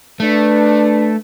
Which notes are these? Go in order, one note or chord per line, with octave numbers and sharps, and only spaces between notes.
A3 D4 B4